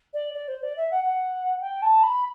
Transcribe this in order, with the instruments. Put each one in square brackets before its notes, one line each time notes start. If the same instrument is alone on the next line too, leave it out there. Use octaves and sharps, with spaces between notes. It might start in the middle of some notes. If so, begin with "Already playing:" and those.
[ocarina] D5
D5
C5
D5
E5
F#5
F#5
G5
A5
B5